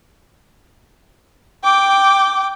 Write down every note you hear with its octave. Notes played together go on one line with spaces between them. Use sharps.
G5 D6